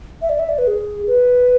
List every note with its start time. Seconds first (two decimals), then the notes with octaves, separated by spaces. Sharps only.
0.22 E5
0.29 D5
0.39 E5
0.49 D5
0.58 B4
0.67 G#4
1.07 B4